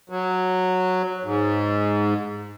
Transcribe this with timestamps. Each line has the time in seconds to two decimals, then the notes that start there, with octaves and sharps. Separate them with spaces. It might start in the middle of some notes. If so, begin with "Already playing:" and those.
0.10 F#3
1.23 G#2